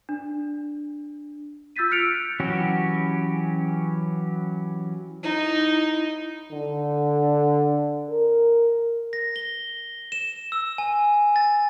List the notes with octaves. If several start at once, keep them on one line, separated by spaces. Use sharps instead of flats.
D4
F4 E6 G6 A6 B6 D#7
F6 F#6 C#7 D7 F7
E3 F#3 C#4 F#4 G4
D#4 E4
D3
A#4
A#6
G7
E7
E6
G#5
A6